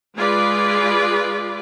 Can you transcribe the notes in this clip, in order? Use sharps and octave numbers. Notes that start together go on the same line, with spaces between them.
G#3 F4 G#4 B4 D5